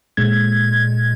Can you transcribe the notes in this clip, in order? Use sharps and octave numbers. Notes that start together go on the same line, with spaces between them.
A#2 G#3 G#6